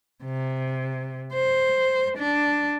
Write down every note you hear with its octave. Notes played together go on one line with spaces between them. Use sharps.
C3
C5
D4